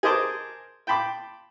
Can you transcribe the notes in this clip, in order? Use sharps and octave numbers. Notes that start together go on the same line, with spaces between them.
G#4 A#4 C5 D#5 A5 D6
G5 A5 B5 C6 D6